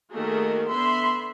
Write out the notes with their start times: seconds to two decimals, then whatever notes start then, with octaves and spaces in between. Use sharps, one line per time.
0.14 D#3 A3 A#3 F#4 G#4 D#5
0.70 D3 B3 E5 B5 C6